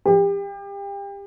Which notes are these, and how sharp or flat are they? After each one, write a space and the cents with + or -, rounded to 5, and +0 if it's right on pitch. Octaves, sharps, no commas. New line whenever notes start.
G4 +30